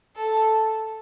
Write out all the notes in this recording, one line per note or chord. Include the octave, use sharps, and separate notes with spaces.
A4